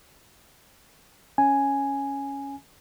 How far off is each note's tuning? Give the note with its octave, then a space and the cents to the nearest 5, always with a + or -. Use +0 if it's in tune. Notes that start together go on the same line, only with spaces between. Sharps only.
C#4 +0 G#5 +0